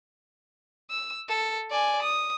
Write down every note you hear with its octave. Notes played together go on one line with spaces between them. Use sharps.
E6
A4
D5 G#5
D#6